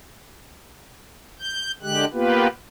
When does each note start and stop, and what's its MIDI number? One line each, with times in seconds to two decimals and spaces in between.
1.39 1.71 91
1.82 2.05 50
1.82 2.05 56
1.82 2.05 67
1.82 2.05 90
2.13 2.47 58
2.13 2.47 59
2.13 2.47 65
2.13 2.47 67
2.13 2.47 71